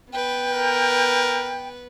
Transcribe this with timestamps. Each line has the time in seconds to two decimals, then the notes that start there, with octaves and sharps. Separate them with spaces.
0.12 B3 B4 G5
0.52 A#4